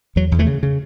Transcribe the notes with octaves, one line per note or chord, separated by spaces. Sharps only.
E2 F#3
E2
E3 A3
C#3
C#3